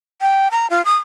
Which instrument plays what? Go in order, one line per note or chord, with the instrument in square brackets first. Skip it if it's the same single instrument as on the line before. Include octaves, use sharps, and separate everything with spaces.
[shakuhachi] G5
A#5
F4
D#6